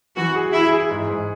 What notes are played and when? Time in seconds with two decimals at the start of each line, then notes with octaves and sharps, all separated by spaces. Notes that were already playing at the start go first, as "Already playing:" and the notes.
0.16 E3 F#4
0.35 G#4
0.53 E4 G#4
0.72 G#4
0.90 G#2
1.08 G#2